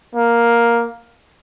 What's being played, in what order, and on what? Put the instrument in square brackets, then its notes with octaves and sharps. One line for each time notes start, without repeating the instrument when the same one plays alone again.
[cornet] A#3